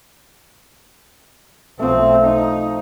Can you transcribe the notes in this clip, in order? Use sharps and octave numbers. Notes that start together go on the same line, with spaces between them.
B1 F3 A3 C4
D#4